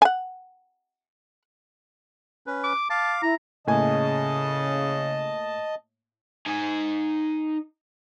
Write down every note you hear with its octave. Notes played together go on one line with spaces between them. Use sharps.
F#5 G#5
C#4 B4
D6
F5 A5 D6
E4 A#5
A2 C#3 A#3 D#5 G#5 A5
D#4 G#5